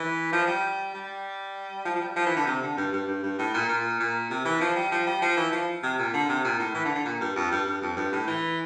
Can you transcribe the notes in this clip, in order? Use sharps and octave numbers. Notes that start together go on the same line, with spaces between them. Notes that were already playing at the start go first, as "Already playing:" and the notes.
Already playing: E3
F3
G3
G3
F3
F3
G3
F3
E3
D3
C3
D3
G2
G2
G2
G2
A2
A#2
A#2
A#2
C3
E3
F3
G3
F3
G3
F3
E3
F3
C3
A#2
D3
C3
A#2
A2
E3
D3
D3
A#2
G2
F2
G2
G2
F2
G2
A2
E3